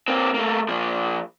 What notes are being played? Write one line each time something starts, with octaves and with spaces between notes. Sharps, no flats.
A#3 C4
A3 A#3
F3 A#3